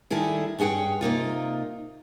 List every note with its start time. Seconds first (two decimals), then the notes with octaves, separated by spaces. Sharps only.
0.10 D#3 G3 A3 E4 G#4
0.59 G2 C#4 G#4 F#5 G5
1.01 C3 A#3 D#4 F4